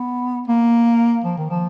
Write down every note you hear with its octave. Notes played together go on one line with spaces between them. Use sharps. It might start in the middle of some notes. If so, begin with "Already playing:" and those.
Already playing: B3
A#3
F3
D#3
F3